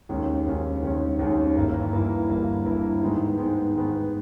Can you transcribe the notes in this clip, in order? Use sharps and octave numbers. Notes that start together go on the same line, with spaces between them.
D#2 D#3 G#3 C#4
D#2 D#3 G#3 C#4
D#2 D#3 G#3 C#4
D#2 D#3 G#3 C#4
G1 G2 E3 A#3 E4
G1 G2 E3 A#3 E4
G1 G2 E3 A#3 E4
G1 G2 E3 A#3 E4
G#2 D#3 G#3 B3
G#2 D#3 G#3 B3
G#2 D#3 G#3 B3